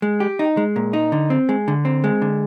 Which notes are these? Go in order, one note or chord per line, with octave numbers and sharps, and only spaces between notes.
G#3
G4
D#4
G#3
A#2
D#4
D3
C4
G#3
D3
C4
G#3
D3